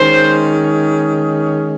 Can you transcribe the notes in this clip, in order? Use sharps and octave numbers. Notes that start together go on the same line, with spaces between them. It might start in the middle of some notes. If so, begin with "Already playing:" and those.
Already playing: D#3 G#3 C#4 C5